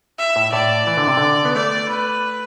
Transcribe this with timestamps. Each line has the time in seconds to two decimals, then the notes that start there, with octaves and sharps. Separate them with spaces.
0.19 E5
0.36 A2
0.53 A2 D5
0.87 E3
0.97 D3
1.07 C3
1.17 D3
1.45 B3
1.55 A3 D5
1.89 B4